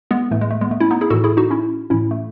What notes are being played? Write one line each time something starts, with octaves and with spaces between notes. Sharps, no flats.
G#3 B3
A2 E3 A3
G#3
A3
G#3 B3
A3
C#4 E4
B3 D#4
E4 G#4
A2 E3 F#4 A4
E4 G#4
D#4 F#4
C#4 E4
A2 E3 C#4 E4
A3